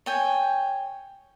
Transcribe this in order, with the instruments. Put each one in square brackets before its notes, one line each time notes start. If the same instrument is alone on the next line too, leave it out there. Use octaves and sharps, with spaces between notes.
[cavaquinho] C#5 G5 G#5